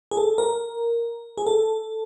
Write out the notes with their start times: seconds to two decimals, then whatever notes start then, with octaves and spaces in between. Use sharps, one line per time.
0.11 G#4
0.17 A4
0.38 A#4
1.38 G#4
1.46 A4